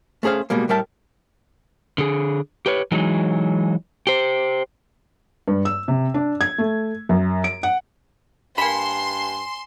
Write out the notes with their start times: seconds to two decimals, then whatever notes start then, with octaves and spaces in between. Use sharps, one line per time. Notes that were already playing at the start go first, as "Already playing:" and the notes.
0.23 A3 C#4 G#4 C5 F5
0.50 B2 G3 G#3 A#3
0.69 A2 G3 A#4 E5 G5 A5
1.98 D3 G#4
2.66 G4 B4 C#5
2.92 E3 F#3 G#3 D#4
4.07 G4 C5
5.48 G2
5.65 E6
5.88 C3
6.14 D4
6.41 G#6
6.58 A3
7.09 F#2
7.44 D7
7.63 F#5
8.58 G2 A#3 G#5 B5 C6 E7